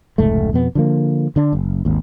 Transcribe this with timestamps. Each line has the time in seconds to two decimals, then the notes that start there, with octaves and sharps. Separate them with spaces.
0.18 F1 C#2 G#2 A3
0.53 F2 B2 B3
0.75 D3 F3 A#3
1.36 D3 D4
1.53 F#1
1.85 G#1 D#2